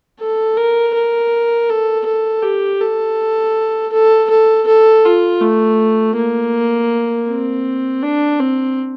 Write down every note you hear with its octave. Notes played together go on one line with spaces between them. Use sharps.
A4
A#4
A#4
A4
A4
G4
A4
A4
A4
A4
F4
A3
A#3
C4
D4
C4